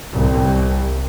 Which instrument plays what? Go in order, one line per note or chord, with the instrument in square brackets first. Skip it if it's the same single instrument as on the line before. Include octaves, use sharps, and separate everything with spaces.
[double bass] C2